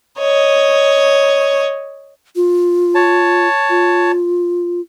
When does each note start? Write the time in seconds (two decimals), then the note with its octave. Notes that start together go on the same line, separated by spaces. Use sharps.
0.19 C#5 D#5
2.36 F4
2.95 C#5 A5
3.70 F4